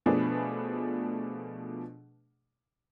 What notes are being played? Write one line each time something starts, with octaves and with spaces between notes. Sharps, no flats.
B2 F3 A3 D4 G#4 B4